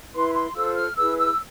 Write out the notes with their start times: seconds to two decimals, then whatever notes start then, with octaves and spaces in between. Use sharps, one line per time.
0.14 E4 B4 C6
0.34 C6
0.54 F4 A4 C5 E6
0.75 F6
0.96 E4 G#4 B4 E6
1.17 E6